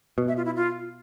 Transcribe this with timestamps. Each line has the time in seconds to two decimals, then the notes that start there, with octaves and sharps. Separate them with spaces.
0.18 B2
0.28 E5
0.37 F4
0.46 E4
0.56 F4